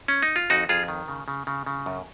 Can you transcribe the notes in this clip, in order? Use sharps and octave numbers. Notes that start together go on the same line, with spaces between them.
C#4
D#4
F4
F2 D#4 F#4
F2 F4 G#4
D#3
C#3
C#3
C#3
C#3
F#2